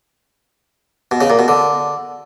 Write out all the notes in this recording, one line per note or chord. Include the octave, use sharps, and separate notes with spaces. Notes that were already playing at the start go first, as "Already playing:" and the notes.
B2
C#3
A#2
B2
D3